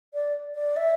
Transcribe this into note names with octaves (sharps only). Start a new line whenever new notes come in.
D5
D5
E5